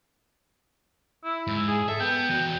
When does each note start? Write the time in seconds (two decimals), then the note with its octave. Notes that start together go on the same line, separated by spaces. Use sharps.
1.24 E4
1.47 G#2
1.68 G#4
1.88 A4 E5
2.00 B3 G5
2.29 E3 F#4